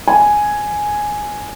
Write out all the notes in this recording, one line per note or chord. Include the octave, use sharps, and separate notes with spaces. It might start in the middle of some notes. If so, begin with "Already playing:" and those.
G#5